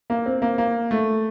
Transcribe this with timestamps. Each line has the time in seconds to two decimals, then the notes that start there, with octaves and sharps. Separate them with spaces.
0.10 A#3
0.26 C4
0.42 A#3
0.58 A#3
0.91 A3